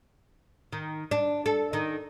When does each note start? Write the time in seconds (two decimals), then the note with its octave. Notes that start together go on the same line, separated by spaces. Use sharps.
0.73 D#3
1.11 D4
1.46 A4
1.73 D#3